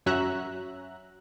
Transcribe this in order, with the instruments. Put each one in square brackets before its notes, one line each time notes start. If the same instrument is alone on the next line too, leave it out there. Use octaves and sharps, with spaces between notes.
[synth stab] F#2 C#4 F#4 E5 A#5 F#6